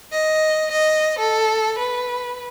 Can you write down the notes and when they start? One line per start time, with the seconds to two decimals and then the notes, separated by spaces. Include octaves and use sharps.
0.12 D#5
0.72 D#5
1.19 A4
1.79 B4